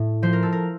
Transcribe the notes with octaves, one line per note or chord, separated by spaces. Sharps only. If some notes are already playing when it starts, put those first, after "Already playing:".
Already playing: A2
F3 C5
A#4
A4
A#4